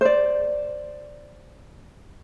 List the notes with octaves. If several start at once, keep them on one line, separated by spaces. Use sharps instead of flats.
C5 D5